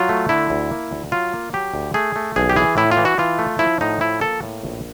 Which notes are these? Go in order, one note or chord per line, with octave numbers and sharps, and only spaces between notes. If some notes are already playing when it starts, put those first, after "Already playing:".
Already playing: F#3 F4
A3
D3 E4
D2
A#3
D2
F#3 F4
A#3
F#3 G4
D2
A3 G#4
A3
B1 G#4
G4
E3 G#4
A2 E4
F4
E3
F#4
E3 F4
A3
F3 E4
A2 D#4
F3 E4
A#3 A4
A2
A#1